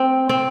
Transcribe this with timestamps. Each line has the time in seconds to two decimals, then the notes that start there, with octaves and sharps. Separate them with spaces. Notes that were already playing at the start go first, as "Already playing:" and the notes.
Already playing: C4
0.29 C4